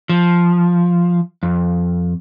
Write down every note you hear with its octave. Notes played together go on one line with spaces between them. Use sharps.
F3
F2